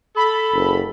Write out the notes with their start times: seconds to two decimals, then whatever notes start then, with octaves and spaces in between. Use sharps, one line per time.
0.16 A4 B5
0.54 F#1